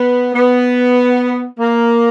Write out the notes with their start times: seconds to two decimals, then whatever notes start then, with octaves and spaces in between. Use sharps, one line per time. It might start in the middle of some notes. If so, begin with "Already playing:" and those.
Already playing: B3
0.35 B3
1.59 A#3